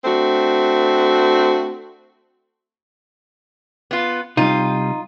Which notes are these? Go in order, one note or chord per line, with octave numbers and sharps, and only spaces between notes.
A3 C4 D4 F#4
B3 F4
C3 G3 D#4 F4